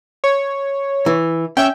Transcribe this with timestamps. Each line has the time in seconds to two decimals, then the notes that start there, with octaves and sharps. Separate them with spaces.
0.24 C#5
1.06 E3
1.57 C#4 E5 G5